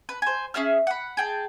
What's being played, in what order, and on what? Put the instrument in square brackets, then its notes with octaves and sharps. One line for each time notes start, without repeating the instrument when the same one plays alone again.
[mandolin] B4
C5 G#5
C#4 G#4 E5 F6
F#5 B5
G#4 G5 A5